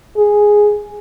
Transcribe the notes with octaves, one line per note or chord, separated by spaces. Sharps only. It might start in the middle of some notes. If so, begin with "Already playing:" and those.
G#4